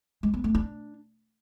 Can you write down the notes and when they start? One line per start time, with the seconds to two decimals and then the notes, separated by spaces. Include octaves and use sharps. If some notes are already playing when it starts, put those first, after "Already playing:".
0.23 G#3
0.34 B3
0.44 A3
0.55 D4